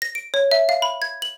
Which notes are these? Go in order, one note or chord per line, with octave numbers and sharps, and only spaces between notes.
A#6
D7
C#5
E5
F5
B5
G#6
F#7